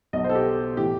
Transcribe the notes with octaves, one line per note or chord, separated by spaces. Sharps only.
B1 B2 F#3 D#5
C5
A4
G4
A2 E3 G4